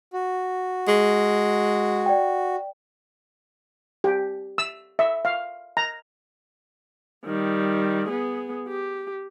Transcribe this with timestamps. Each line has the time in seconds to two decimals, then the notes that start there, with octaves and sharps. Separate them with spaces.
0.13 F#4
0.88 G#3 G#4
2.06 D5 G5
4.04 G4
4.58 E6
4.99 E5
5.25 F5
5.77 A#5
7.25 D#3 G3
8.09 B3 G#4
8.68 G4